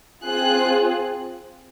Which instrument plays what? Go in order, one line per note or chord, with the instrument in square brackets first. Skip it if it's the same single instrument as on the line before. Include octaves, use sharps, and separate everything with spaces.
[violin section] C4 F4 G#4 F#6